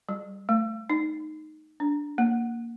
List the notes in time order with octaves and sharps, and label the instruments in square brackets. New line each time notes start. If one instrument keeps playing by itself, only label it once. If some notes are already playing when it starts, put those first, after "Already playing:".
[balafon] G3
A3
D#4
D4
A#3